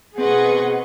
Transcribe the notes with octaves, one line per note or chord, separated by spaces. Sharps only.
B2 C4 G#4 B4 D#5 F#5 C#6